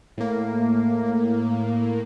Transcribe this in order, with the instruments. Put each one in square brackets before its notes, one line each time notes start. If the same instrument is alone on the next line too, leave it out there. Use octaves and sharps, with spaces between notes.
[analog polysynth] A2 A#3